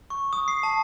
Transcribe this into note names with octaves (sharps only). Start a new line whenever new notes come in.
C#6
D#6
C7
A5